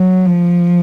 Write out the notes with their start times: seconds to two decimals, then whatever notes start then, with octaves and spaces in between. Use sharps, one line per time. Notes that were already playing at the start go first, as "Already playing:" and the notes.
Already playing: F#3
0.26 F3